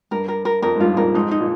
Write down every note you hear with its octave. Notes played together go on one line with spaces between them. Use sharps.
G2 A#4
A#4
A#4
F2 A#4
G#2
G2 F4
A#2
F2 G#2 A#4
F2 G#2 D#4
D#4
A#2